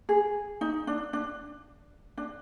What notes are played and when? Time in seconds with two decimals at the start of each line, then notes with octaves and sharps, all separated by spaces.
0.09 G#4
0.61 D#4
0.87 D4
1.13 D4
2.17 D4